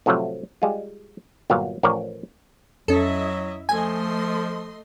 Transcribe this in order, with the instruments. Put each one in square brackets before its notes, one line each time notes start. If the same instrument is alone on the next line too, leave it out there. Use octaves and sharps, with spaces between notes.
[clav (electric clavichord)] A2 C3 F3 F#3 A3
G3 G#3 F4
G1 A#2 F#3 F5
A1 F3 A#4 C#5 D5
[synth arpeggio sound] F2 C#4 [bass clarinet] F#3 [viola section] E4 D#5 E5 [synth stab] A4
[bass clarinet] F3 [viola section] A3 D#5 C6 [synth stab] G#5